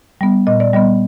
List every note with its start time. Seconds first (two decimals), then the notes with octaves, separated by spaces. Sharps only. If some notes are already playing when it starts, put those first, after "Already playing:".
0.21 G3 B3
0.47 A#2 D#5
0.60 D5
0.73 G3 B3 D#5